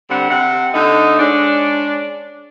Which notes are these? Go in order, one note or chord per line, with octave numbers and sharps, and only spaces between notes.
D3 G3 C4 F#5
C3 F#5
D3 A3 D#4
G#3 C#4 D4